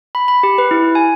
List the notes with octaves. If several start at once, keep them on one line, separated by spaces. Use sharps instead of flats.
B5
B5
G4
B4
E4
G#5